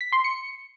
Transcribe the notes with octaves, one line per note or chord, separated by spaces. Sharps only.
B6
C6
C#7